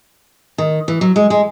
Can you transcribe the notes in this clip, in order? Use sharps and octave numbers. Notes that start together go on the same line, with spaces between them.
D#3
E3
F#3
G#3
G#3